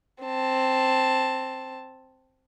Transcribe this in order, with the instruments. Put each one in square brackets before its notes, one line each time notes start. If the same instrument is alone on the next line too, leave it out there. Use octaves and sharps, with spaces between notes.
[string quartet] C4 A5